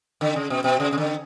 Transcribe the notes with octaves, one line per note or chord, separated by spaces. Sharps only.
D3
C#3
B2
B2
C#3
C#3
D3